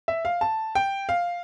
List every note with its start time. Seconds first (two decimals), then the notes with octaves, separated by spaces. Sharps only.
0.08 E5
0.25 F5
0.41 A5
0.75 G5
1.09 F5